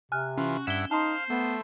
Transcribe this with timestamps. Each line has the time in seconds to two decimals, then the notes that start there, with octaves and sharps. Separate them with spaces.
0.12 C3 G#5 F6 F#6
0.38 E3 C#4 F4 F#4
0.67 G2 E4 E5 F#5 E7 G7
0.91 D#4 C5 F5 A5 C6
1.30 A3 B3